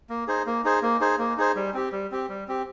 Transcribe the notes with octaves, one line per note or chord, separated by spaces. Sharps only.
A#3
D#4 G#4 C5
A#3
D#4 G#4 C5
A#3
D#4 G#4 C5
A#3
D#4 G#4 C5
G3
C4 G4
G3
C4 G4
G3
C4 G4